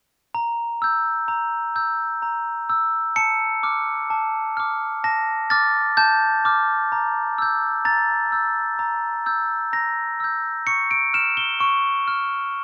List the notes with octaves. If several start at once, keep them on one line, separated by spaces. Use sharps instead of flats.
A#5
E6 G6
A#5
E6 G6
A#5
E6 G6
A5 C#7
D6 F6
A5
D6 F6
A5 A#6
D6 F6 A6
A5 G6
D6 F6
A#5
E6 G6
A#5 A6
E6 G6
A#5
E6 G6
A#5 A#6
E6 G6
C#6 C#7
D7
F6 E7
G7
C#6
F6